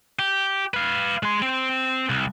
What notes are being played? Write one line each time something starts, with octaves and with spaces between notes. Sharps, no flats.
G4
B4 F5
G#3 C6
C4
C2